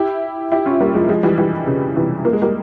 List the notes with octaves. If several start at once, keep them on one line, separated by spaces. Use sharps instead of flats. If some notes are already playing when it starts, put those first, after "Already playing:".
Already playing: E4 G4
E4 G4
C#4 F4
G3 A#3
F3 G#3
F3 G#3
E3 G3
E3 G3
C#3
C3 E3
A#3
G#3
G3 A#3